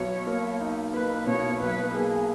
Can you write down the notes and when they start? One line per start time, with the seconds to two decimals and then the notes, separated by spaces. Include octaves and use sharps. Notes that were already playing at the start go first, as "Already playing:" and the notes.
Already playing: B1 B2 C#5
0.26 A#3
0.60 D#4
0.93 A#3 B4
1.27 B2 C#5
1.61 B1 B4
1.94 A#3 G#4